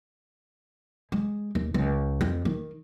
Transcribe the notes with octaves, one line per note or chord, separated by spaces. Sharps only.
G#3
D#2
C#2
F2
D#3